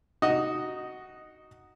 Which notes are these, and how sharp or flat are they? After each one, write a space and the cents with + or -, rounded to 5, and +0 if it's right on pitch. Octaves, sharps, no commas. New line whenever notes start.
D#4 +0 F#4 +5 D#5 +0